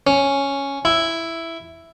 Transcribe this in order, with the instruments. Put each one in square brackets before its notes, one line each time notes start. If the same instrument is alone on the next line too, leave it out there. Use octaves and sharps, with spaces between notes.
[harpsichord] C#4
E4